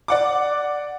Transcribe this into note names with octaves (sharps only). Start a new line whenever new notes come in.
D5 F#5 D6